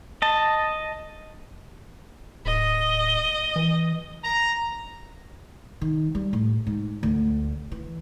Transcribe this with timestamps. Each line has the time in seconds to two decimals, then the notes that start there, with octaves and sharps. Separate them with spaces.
0.22 D#5 A5
2.46 D1 D#5
3.56 E3
4.24 A#5
5.81 D#3
6.15 G3
6.33 A2
6.67 G#2
7.03 D2
7.72 E3